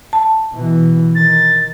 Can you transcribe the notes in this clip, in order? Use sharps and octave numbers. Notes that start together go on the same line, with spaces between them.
A5
B2 E3
D#3 A6